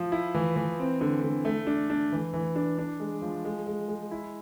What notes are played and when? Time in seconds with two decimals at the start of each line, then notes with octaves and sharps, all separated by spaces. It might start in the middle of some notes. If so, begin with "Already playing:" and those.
Already playing: F3
0.12 E4
0.34 E3
0.56 E3
0.79 C4
1.01 D3
1.23 D3
1.45 A3
1.67 D4
1.90 D4
2.12 E3
2.34 E3
2.56 D4
2.78 D4
3.00 G#3
3.22 F3
3.45 G#3
3.67 G#3
3.88 G#3
4.11 E4